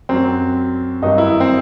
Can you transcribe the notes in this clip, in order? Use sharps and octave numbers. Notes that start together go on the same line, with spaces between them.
F#2 F#3 C4
G2 D#3 F#3 D#4
E4
C4